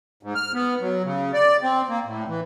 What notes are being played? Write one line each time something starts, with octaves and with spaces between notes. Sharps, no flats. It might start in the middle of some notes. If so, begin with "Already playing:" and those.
G#2
F6
B3
F#3
C#3
D5
C4
A#3
A2
E3